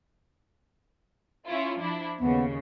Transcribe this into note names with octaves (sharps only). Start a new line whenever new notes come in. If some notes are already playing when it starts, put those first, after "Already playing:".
C#4 E4 F4
F3 D4 E4
D#2 C#3 B3